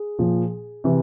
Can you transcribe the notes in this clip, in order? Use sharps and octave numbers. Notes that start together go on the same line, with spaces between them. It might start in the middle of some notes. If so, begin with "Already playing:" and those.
Already playing: G#4
A#2 F3
C3 E3